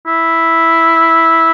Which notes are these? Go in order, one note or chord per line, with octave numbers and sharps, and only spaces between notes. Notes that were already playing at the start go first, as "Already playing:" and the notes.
E4